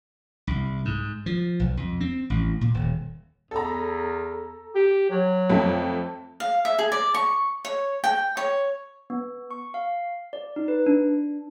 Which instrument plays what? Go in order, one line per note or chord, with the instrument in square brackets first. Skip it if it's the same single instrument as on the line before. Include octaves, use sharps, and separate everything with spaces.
[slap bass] C2
G#2
F3
B1
F2
C4
A1
A#2
D#1
[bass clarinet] E2 [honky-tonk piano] A4 A#5
[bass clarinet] G4
F#3
[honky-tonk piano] F2 A3 C4
[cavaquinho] F5
E5
G#4
D5
C#6
C#5
G5
C#5
[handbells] B3
C#6
F5
D5
D#4
B4
D4